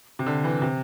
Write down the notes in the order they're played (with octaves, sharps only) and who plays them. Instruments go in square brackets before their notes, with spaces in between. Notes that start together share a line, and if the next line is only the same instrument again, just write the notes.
[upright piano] C3
D3
E3
C3